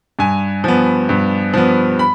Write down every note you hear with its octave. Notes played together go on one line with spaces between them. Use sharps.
G2 G#5
F3 B3
G2
F3 B3
B5